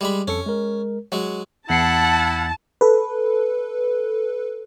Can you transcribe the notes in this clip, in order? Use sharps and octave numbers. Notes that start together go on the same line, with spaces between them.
G3 G#3 B5
F2 C#4 A4 C#7
G#3 A#4
F#3 G#3 F#5
E2 E4 F#5 A5 C7 C#7
A4 B4